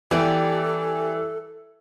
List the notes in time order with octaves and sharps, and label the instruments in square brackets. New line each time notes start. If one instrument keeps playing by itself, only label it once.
[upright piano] E3 [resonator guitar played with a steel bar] G3 B3 G4 [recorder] A4